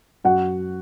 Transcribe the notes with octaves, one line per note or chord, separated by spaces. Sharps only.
F#2 F#4 F#5